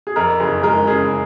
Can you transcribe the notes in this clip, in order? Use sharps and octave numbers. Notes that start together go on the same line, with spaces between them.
G#4
F2 A#4
F#1 G#4
G#3 A#4
C#3 G#4